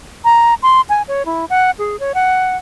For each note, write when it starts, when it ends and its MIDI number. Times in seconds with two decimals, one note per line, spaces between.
0.24 0.54 82
0.62 0.81 84
0.89 1.02 80
1.08 1.25 73
1.26 1.45 64
1.50 1.71 78
1.79 1.99 68
2.00 2.13 73
2.15 2.57 78